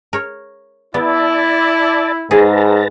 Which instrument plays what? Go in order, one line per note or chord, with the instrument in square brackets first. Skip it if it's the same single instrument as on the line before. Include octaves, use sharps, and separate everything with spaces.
[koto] A#4 C#5
[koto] B3 [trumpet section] E4 [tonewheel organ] D5 A5
[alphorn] G#2 [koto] G#4 [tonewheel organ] B4 A5 A#5